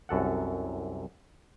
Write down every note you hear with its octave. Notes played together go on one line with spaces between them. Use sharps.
C2 F#2 A4 F#5